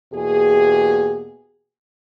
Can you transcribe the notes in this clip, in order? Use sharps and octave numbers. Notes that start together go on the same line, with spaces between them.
E2 B2 A#3 G4 G#4